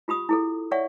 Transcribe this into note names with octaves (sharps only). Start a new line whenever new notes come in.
F4 G4 B5 D#6
E4 G#4 A4
C#5 D5 E5 F#5 G5 C#6